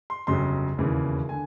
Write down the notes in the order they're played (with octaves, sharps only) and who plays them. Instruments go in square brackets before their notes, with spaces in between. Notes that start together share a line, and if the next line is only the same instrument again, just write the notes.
[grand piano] C6
G1 F2 C#3 F#3 C6
E1 D#2 C#3 E3
D3 G#5